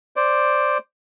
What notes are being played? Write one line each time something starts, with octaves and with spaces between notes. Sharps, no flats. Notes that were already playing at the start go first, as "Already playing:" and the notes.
C5 D5